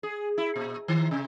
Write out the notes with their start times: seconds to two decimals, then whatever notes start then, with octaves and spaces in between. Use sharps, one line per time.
0.03 G#4
0.38 E4
0.56 A#2
0.88 D#3
1.11 C3